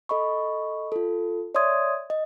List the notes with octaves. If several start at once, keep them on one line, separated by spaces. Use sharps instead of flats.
A4 D#5 B5 C#6
F4 A4
C#5 D5 E5 C6 D#6 G#6
D#5